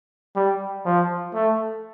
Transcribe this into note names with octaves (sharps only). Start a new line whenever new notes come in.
G3
F3
A3